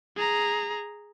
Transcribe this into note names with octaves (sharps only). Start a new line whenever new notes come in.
G#4 A#5